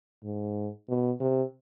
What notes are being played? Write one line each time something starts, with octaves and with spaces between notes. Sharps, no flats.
G#2
B2
C3